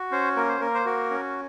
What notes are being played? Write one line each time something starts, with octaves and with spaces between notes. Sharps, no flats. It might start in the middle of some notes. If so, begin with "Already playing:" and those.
Already playing: F#4
C#4 C5
A#3 A#4
C5
A#3 A#4
C5
F#4 A#4
C#4